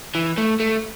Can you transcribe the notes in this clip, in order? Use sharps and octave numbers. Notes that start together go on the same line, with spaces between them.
E3
A3
A3